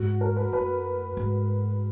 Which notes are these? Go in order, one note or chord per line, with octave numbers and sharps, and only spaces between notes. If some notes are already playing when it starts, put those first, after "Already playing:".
Already playing: G#2 F#4
A#4
B4
F#2 B4
G#2